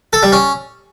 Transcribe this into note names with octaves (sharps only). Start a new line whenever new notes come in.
A4
G3
C#4